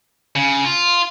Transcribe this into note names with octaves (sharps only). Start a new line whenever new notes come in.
C#3
F4